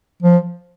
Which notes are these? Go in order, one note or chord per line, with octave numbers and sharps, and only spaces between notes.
F3